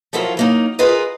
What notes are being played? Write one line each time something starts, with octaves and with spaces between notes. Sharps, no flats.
F3 F#3 E4 F4 A4 A#4
F#3 A#3 D#4
F4 G#4 A#4 B4 D#5